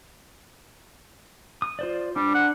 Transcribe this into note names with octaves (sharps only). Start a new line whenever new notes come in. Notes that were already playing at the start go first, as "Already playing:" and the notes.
D#6
F4 C5 D5
G3 D4
F#5